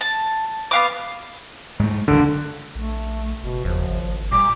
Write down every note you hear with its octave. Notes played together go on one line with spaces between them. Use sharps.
A5
B3 F5 D6
G#2 A3
F#1 D2 D3 D#3
A#1 A3
F#1 B2
F#1 E2 F3
G#1
A#2 G3 D6